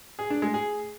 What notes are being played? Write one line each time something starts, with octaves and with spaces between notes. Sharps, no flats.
G#4
D4
G#3
G#4